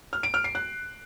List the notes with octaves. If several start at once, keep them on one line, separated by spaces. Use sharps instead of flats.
F6
D7
F6
C7
F#6